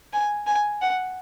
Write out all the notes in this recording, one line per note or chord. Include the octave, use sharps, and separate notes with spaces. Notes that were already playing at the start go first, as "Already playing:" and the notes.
G#5
G#5
F#5